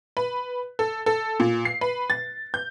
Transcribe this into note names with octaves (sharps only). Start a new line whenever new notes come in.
B4
A4
A4
A#2
C7
B4
A6
G6